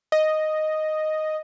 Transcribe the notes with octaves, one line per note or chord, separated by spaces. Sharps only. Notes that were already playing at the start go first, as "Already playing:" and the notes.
D#5